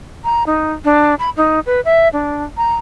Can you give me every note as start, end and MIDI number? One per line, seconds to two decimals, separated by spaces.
0.24 0.44 82
0.47 0.73 63
0.85 1.15 62
1.19 1.30 83
1.37 1.60 63
1.66 1.81 71
1.85 2.08 76
2.13 2.43 62
2.57 2.76 82